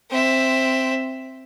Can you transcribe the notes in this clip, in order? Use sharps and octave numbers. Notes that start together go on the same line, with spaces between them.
C4 E5